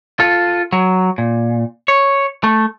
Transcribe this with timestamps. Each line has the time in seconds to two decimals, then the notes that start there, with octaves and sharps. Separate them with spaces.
0.20 F4 A4
0.73 F#3
1.18 A#2
1.88 C#5
2.44 A3